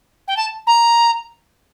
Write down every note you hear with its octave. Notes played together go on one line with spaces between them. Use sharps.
G5
A5
A#5